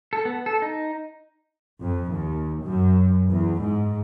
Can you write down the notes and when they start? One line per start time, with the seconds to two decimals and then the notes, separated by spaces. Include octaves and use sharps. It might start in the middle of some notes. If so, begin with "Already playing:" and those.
0.13 A4
0.25 B3
0.46 A4
0.62 D#4
1.82 F2
2.12 D#2
2.64 F#2
3.28 E2
3.59 G#2